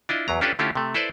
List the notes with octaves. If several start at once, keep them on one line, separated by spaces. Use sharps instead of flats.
D4 E4 F4 D#5
E2 F#3 A#5
C#4 D4 F4 G4 A4 B4
D3 A3 C#4 E4 F4 G4
C3 A3
E4 A4 B4 C5 D5